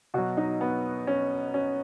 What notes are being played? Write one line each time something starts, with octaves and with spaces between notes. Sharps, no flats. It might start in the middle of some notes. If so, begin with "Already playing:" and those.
B2 F#3 F#4
D#4
B3
C#4
C#4